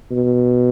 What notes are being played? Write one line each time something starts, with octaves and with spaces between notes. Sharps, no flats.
B2